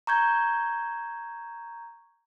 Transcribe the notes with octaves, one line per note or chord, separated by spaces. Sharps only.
A#5 C#6 G6 G#6